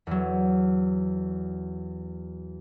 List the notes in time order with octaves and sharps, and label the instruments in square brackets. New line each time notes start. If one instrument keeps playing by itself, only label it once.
[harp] E2 F#3